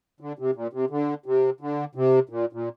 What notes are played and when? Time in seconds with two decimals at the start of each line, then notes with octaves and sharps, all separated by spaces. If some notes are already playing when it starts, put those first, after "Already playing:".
0.20 D3
0.39 C3
0.55 A#2
0.73 C3
0.90 D3
1.26 C3
1.61 D3
1.95 C3
2.29 A#2
2.53 A#2